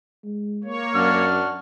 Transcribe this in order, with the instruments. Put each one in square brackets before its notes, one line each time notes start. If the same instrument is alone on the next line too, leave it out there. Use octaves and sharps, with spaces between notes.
[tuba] G#3
[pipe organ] A#3 C#5
[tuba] F#2 [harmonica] D4 F#4 F6